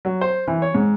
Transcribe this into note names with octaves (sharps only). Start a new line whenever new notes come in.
F#3
C5
E3
C#5
G#2